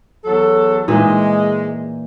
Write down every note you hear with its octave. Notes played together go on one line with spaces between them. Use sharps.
E2 F#3 A4
A#2 E3 G#3 D#4